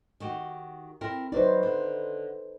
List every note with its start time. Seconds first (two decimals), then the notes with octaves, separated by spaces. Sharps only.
0.20 D#3 F#4 G4
1.01 C4 E4 A#4
1.32 F#3 D#4 B4 C5 D5
1.63 D3